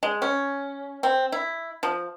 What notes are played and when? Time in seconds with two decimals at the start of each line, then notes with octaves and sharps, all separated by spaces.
0.03 G#3
0.22 C#4
1.03 C4
1.32 E4
1.83 F3